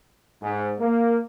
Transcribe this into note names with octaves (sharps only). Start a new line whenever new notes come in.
G#2
A#3